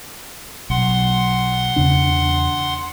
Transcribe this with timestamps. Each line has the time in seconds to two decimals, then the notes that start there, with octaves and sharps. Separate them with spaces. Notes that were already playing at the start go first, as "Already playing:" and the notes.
0.70 B1 F#5 C6
1.76 E2 C#3 D4